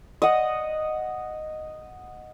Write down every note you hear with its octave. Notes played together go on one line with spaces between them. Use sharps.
D#5 F#5